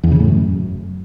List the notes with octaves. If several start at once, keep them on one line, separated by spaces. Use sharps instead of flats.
E2
C#3
A2
F#2